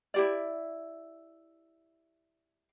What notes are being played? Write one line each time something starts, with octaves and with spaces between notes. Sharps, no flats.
E4 G4 D5